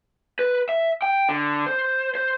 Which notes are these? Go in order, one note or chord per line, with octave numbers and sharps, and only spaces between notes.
B4
E5
G5
D3
C5
C5